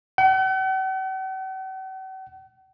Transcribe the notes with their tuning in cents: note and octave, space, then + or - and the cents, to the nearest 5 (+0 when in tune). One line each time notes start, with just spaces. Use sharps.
F#5 +45